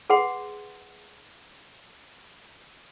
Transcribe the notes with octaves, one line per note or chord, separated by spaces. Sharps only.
G#4 B4 F#5 C6